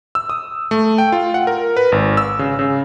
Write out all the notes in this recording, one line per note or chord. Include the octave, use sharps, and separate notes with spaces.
E6
D#6
A3
G5
F4
F#5
A#4
B4
G#1
E6
C#3
C#3